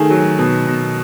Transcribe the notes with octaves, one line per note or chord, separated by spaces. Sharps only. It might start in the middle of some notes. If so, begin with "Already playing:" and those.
Already playing: D#3 A3 G#4
F#3
B2
B2